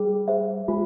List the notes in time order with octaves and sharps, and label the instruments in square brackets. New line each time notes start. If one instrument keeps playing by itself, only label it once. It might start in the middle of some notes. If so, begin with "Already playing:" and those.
Already playing: [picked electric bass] G3 [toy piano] G#4
[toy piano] C5 E5
[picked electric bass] G#3 [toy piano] F4